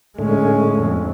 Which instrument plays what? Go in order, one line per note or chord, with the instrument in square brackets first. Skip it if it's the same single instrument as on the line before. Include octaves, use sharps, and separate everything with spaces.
[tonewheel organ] A2 D3 A3 [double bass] G#3 C#4
[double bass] F2